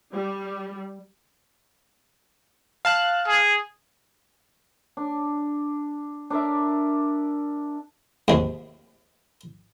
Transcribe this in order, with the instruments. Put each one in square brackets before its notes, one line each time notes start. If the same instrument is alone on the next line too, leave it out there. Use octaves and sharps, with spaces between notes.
[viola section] G3
[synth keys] F5 A5 F#6
[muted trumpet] G#4
[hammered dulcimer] D4
D4 A#4 D5 E5
[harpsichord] D#2 G#2